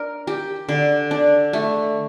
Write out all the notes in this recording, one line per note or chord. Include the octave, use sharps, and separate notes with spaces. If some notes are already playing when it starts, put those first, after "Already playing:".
Already playing: D4 A#4
G4
D3
D4
A3